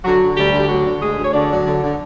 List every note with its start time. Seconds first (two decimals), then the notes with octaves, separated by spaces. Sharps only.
0.05 D3 F#3 F#4
0.22 D3
0.37 D2 G3 G4
0.53 D3
0.60 G4
0.69 D2 F#3 F#4
0.86 D3
1.01 D2 G#3 G#4
1.17 D2
1.25 C#5
1.33 D3 D4 D5
1.51 F#3
1.67 D3
1.83 D3